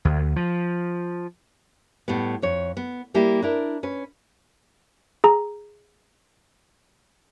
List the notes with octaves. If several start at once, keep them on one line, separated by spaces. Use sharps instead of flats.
D2
F3
A2 G3 B3
F2 C#5
B3
G3 A#3 E4 G4
D4 E4 A#4
C#4 B4
G#4 A#5